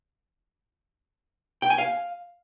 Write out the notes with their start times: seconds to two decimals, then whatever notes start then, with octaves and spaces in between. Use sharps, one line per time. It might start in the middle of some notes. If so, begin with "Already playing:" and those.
1.62 G5
1.70 G#5
1.78 F5